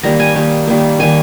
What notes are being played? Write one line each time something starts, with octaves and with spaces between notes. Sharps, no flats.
D#3 G3 A#3 A#5
G#5
D#3 G3 A#3
D#3 G3 A#3
D#3 G3 A#3 G#5